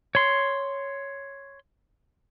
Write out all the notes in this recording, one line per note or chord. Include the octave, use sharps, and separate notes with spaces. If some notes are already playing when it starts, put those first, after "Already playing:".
C#5 C6